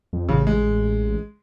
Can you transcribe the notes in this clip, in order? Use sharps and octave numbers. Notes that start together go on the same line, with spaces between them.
F2
A1 C#3
G#3